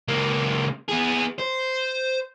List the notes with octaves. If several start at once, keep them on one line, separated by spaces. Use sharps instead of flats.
C#2 A#3
B3 G#4
C5